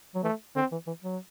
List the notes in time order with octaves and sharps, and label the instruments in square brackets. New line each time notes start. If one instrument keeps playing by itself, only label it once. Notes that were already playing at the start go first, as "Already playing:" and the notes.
[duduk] F#3
[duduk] E3 [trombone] A3
[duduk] D3 [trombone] C4
[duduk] E3
E3
F#3